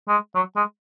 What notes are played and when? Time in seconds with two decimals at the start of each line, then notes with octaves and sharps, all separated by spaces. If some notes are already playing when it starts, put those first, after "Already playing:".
0.08 G#3
0.35 F#3
0.56 G#3